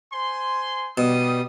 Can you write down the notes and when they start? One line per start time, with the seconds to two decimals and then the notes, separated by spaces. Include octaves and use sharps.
0.13 C5 G#5 C6
0.98 B2 G3 D#6